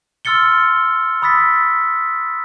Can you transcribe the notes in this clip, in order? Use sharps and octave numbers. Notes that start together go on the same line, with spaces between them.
C6 E6 F6 A6 C#7 G7
B5 D#6 E6 A6 B6